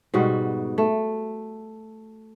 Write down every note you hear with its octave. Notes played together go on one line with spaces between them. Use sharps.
G#2 B2 G3 F#4
A3